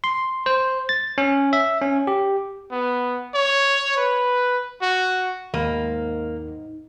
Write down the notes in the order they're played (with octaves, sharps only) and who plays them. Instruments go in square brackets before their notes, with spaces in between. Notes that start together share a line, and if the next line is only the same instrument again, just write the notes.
[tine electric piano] C6
C5
A6
C#4
E5
C#4
G4
[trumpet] B3
C#5
B4
F#4
[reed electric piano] D#2 [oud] G#2 D#3 [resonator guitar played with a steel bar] A#3